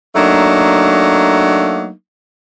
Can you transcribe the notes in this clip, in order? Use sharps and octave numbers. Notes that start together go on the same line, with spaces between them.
F#3 A3 A#3 D4 D#4